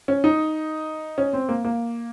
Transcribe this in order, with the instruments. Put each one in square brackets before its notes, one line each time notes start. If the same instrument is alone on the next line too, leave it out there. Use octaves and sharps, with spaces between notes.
[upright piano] C#4
D#4
C#4
C4
A#3
A#3